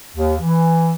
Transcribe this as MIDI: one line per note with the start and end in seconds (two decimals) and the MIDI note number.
0.15 0.35 39
0.40 0.93 52